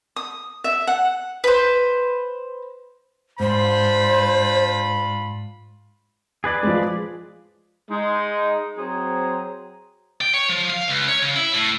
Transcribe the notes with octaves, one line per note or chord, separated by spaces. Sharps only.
D#6
E5
F#5
B4 C5
G#2 D4 F4 C5 B5
G#4 B4 D5
F3 G#3
G#3 D#4
F#3 C4 G#4 C5 A#5
G5
C#5
F3
F5
C#2
C#5
C#3
E4
A2